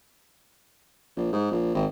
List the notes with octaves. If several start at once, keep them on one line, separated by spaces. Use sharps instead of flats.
A#1
G#2
A#1
G#1